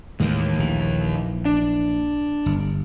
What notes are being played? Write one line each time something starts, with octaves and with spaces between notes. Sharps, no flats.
D#2 A2 E3 G#3
A#1 E3
D4
G1